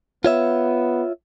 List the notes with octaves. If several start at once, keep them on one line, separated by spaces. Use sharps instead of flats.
B3 F4 C#5 E5